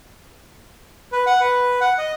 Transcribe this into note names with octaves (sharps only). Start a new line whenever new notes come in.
B4
F#5
B4
F#5
D#5